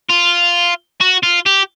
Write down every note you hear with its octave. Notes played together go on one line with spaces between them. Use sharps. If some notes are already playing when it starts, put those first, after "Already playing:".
F4
F#4
F4
G4